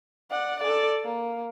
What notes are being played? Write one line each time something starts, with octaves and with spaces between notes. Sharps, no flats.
D5 F#5
A4 D5
A#3